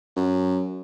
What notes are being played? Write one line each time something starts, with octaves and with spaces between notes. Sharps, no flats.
F#2